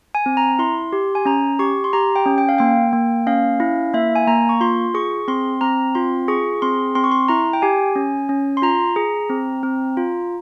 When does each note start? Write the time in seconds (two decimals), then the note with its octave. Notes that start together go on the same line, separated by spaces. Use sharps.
0.15 G#5
0.26 C4
0.37 A#5
0.59 E4 C6
0.93 G4
1.15 G#5
1.25 C#4 A#5
1.59 G4 C#6
1.84 C6
1.93 G4 A#5
2.16 G5
2.26 C#4
2.38 G5
2.49 F5
2.58 A#3 G5
2.93 A#3
3.27 C#4 F5
3.60 E4
3.93 A#3 E5
4.15 G#5
4.27 A#3 A#5
4.49 C#6
4.61 F4 C6
4.94 G#4 C#6
5.28 C4 C6
5.61 C4 A#5
5.95 F4 C6
6.28 G#4 C#6
6.62 C4 C6
6.95 C4 C6
7.04 C#6
7.11 C6
7.28 E4 A#5
7.53 G5
7.62 G4 G#5
7.96 C#4
8.29 C#4
8.57 C6
8.62 F4 A#5
8.96 G#4
9.29 C4
9.63 C4
9.97 F4